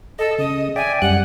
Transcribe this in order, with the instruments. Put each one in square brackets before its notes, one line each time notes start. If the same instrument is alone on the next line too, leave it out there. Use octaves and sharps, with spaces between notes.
[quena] A4 [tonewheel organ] D#5
[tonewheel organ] C#3 [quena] D#5
[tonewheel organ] D5 E5 G5 [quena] G#5
[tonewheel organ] F#2 G3 F#6 [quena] F#5